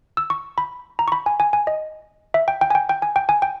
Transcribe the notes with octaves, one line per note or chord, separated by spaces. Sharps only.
E6
C#6
B5
A#5
C#6
B5
G#5
G#5
G#5
D#5
E5
G5
G5
G#5
G5
G5
G#5
G5
G#5
G5